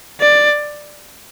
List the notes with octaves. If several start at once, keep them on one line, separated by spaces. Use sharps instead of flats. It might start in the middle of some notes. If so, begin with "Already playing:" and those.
D5